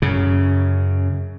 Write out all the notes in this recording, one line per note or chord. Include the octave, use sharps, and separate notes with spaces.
F#2 C#3